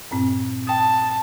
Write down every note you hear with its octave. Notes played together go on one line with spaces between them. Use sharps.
G2 A#2 C4
G5 A5 D#6